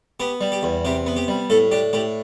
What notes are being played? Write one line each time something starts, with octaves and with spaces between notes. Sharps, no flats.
B3 G4
G3
G4
E2
C3 G4
B3
G4
G3
A2 A4
D4 G4
A2 G4